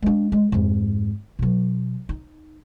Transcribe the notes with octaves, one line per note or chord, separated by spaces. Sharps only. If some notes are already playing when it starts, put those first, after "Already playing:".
G#3 D4
G#3
F2 G#2
B2 F#3
D#4